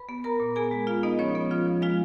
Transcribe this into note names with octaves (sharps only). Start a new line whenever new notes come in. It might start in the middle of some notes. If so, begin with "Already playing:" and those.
Already playing: B4 B5
B3
B3 A#4 A#5
A#2
B3 G#4 G#5
G#3
B3 F4 F5
B3 D#4 D#5
F3 C#4 C#5
B3
F3 F4 F5
F3
G#3 F4 F5